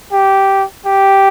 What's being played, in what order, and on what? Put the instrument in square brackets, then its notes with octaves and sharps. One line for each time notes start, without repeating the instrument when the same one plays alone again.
[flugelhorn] G4
G4